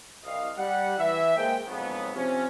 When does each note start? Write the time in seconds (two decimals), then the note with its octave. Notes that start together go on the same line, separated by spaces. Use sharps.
0.24 C2 D#5 F5
0.57 G3 F#5
0.98 E3 E5
1.35 G#3 A#3 C5 G5
1.66 F2 G#2 C#3 F#3 B3
2.14 C3 F3 C4 C#4